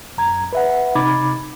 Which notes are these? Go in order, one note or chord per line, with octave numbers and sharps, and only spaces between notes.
F#2 A#5 G#6
B4 E5 F#5
C3 D#4 B5 D6 G#6 A6